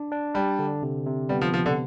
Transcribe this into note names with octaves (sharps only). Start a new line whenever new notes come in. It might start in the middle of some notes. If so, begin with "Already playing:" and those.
Already playing: D4
D4
G3 D4
D3
C3
C3
G3 B3
F3
C3 F3
D3